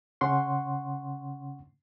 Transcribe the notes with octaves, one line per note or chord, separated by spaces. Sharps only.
C#3 C#4 F#5 C6 C#6